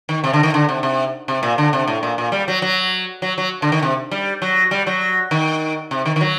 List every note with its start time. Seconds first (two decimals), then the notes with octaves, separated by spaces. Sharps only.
0.09 D#3
0.24 C3
0.33 D3
0.43 D#3
0.54 D3
0.69 C3
0.83 C3
1.28 C3
1.43 A#2
1.58 D3
1.73 C3
1.88 A2
2.03 A#2
2.18 A#2
2.32 G3
2.48 F#3
2.62 F#3
3.22 F#3
3.38 F#3
3.62 D3
3.72 D#3
3.83 C3
4.11 G3
4.42 F#3
4.71 G3
4.87 F#3
5.31 D#3
5.91 C3
6.06 D#3
6.16 D#3
6.21 F#3